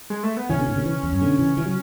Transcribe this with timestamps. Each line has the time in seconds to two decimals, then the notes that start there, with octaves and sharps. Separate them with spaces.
0.10 G#3
0.23 A3
0.37 B3
0.49 C#3 E3 C#4
0.59 B2 D3
0.68 A2 C#3
0.76 B2 D3
0.85 C#3 E3
1.03 E2
1.13 F#2
1.21 B2 D3
1.39 C#3 E3
1.57 C#3 E3
1.66 F#3